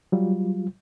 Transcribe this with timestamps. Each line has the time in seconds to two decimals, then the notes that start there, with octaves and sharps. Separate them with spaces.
0.12 F#3 G3 F4